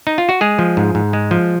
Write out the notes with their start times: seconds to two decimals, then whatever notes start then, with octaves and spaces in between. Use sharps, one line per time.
0.07 D#4
0.18 F4
0.29 F#4
0.41 G#3 G#4
0.59 F3
0.77 G#2
0.95 G#2
1.13 G#3
1.31 F3